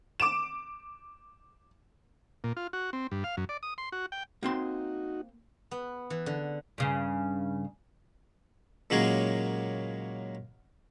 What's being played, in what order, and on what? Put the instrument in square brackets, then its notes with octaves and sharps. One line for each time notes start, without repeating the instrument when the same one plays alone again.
[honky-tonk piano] D6 D7 E7
[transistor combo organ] A#2
F4
F#4
C4
G2
F5
F#2
D5
D#6
C6
F#4
G5
[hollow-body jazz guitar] A#3 C4 C6 [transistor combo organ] D#4 F#4
[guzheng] B3
E3
D3
[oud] G2 C#3
[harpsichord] A#2 C#3 F#3 G#3 A#3 G#4